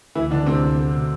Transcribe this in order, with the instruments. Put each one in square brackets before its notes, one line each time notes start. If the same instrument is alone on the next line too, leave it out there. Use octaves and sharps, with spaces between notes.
[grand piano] D2 [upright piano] E3 E4
[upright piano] D3 D4 [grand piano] E3
[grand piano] D2 [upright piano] C3 C4
[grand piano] D2
A3
B2